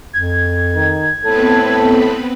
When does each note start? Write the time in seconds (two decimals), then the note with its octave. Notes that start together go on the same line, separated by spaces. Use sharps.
0.13 F2 G#6
0.75 D#3
1.25 A2 B3 C4 A4 B4